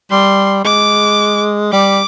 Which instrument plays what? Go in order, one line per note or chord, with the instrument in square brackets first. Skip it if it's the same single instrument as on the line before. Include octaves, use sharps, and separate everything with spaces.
[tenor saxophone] G3 [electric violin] C6
[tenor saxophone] G#3 [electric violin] D6
[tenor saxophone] G3 [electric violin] D6